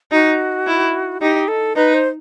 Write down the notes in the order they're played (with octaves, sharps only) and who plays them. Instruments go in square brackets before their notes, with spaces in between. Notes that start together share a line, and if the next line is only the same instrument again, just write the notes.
[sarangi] D#4 [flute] F#4
[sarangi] E4
[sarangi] D#4 [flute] G4
[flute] A4
[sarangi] D#4 [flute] B4
[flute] C5